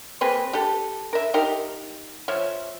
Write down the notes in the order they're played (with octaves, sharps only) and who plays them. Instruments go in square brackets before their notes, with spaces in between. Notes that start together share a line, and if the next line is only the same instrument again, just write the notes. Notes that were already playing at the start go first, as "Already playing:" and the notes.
[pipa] A#3 C4 G#4 B4
G4 A4
A#4 E5
D#4 G4 A#4 F5
F3 F4 C#5 E5